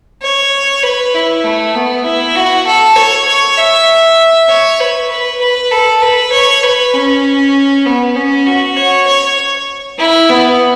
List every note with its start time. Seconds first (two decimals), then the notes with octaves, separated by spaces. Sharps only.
0.22 C#5
0.83 B4
1.14 E4
1.44 A3
1.75 B3
2.05 E4
2.36 F#4
2.67 A4
2.96 C#5
3.28 C#5
3.58 E5
4.49 C#5
4.80 B4
5.10 B4
5.41 B4
5.71 A4
6.02 B4
6.32 C#5
6.63 B4
6.94 C#4
7.85 B3
8.16 C#4
8.46 F#4
8.77 C#5
9.07 C#5
9.99 E4
10.29 B3